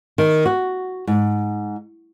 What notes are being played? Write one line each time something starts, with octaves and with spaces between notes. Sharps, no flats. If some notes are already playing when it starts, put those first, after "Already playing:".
D#3
F#4
G#2